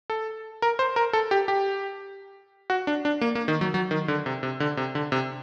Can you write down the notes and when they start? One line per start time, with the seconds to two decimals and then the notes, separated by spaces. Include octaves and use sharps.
0.10 A4
0.62 A#4
0.79 C5
0.96 A#4
1.13 A4
1.31 G4
1.48 G4
2.70 F#4
2.87 D4
3.05 D4
3.21 A#3
3.35 A#3
3.48 D#3
3.61 F#3
3.74 F#3
3.91 D#3
4.08 D3
4.26 C3
4.43 C3
4.60 D3
4.77 C3
4.95 D3
5.12 C3